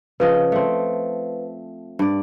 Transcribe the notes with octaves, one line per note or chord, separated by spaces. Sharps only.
C#3 F3 B4 D#5 F5
A3 C4
G2 D5